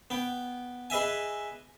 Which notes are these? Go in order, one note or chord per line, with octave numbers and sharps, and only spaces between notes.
B3 G5
G#4 B4 D#5 E5 G#5